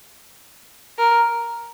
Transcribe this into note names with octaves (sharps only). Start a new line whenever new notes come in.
A#4